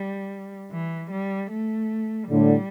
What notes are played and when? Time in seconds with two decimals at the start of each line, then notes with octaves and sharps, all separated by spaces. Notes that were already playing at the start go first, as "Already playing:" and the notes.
Already playing: G3
0.72 E3
1.11 G3
1.51 A3
2.30 A2 D3 G3